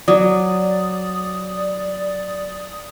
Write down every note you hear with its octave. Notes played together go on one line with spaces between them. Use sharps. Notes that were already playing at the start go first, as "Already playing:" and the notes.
F#3 D5 D#6